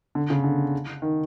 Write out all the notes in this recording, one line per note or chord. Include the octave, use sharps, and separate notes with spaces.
D3
C#3
D3
D#3